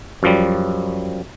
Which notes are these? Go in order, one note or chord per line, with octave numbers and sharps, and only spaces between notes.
F#2 F3 G3